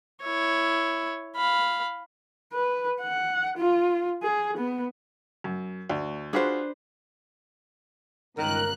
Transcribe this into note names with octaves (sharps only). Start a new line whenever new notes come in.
E4 C#5
F5 B5
B4
F#5
F4
G#4
B3
F#2
D2
D4 F4 F#4 G#4 B4 C5
G1 C#2 D#3 A#4 F#6